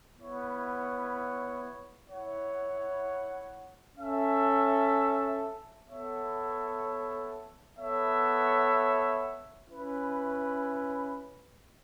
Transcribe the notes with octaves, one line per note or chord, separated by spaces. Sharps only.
B3 E4 C#5
E4 C#5 F#5
C#4 A4 E5
B3 A4 C#5 E5
B3 A4 C#5 E5
C#4 E4 B4